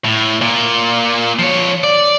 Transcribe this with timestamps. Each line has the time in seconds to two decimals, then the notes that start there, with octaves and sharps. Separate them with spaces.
0.05 A2
0.41 A#2
1.39 F3 C#5
1.83 D5